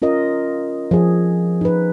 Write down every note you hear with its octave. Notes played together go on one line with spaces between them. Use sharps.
C#4 F4 A#4 D#5
F3 G#4
D#4 B4